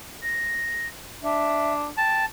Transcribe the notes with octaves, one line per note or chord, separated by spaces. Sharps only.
A#6
D4 E5
G5 A5